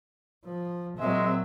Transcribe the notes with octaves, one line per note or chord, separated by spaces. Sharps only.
F3
A#2 F#3 G#3 C4 E5